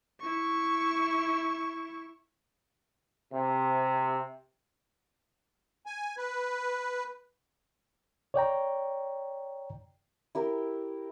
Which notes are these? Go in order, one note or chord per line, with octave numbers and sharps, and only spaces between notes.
E4 C#6
C3
G#5
B4
C#5 D5 G5 A#5
E4 G4 A#4